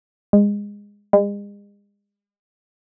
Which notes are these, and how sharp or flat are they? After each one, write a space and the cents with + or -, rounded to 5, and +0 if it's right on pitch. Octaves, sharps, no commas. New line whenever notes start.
G#3 -20
G#3 -40